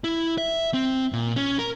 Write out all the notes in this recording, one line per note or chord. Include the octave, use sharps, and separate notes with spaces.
E4
E5
C4
A#2
C#4
A#4